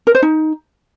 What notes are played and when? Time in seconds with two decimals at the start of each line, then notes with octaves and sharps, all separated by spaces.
0.07 A#4
0.15 C5
0.22 D#4